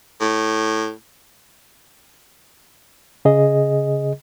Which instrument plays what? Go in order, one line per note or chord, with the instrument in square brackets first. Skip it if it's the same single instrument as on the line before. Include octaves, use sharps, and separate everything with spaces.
[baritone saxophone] A2
[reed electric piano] C#3 G#4 D#5